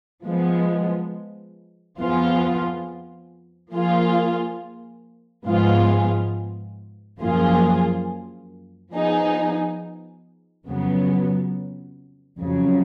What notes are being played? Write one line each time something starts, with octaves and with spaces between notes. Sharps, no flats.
F3 G#3 B3
F2 F3 B3 F4 G#4
F3 A#3 F4 G#4
G#2 F3 B3 F4 G#4
F#2 F3 A#3 F4 G#4
F3 B3 D#4 G#4
F2 C#3 F#3 B3
F2 C#3 F#3